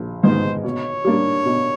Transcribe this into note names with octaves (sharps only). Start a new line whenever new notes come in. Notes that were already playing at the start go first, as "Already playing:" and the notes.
Already playing: A#1
G#2 D#3 G#3 B3 C5
B2 C#5
G3 A#3 D4
B2